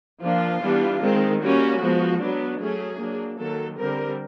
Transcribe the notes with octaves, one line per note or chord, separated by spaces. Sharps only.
F3 A#3 D4 F4
E3 G3 B3 D4
D#3 G#3 C4
G3 A#3 C#4 F#4
F3 G#3 B3
F#3 B3 D4
F#3 A3 C#4 G#4
F#3 A#3 D4
D#3 F#3 A#3 A4
D3 G3 C4 A#4